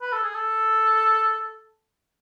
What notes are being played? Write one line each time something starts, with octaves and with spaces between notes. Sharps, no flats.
B4
A4
G#4
A4